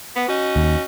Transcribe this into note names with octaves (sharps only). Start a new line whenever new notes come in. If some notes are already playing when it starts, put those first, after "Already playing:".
B3
C#4 D#4 F#4
D#2